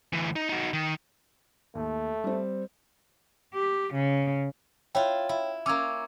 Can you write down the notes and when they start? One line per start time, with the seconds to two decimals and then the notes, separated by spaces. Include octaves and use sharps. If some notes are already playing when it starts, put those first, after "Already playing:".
0.13 D2 E3
0.36 D#4
0.49 D#4 F#4
0.73 D#3
1.75 D#2 A3
2.24 G3 C4
3.54 G4
3.94 C#3
4.95 E4 F4 C#5 G5
5.29 E4
5.66 A#3 C#4 D6 E6 G#6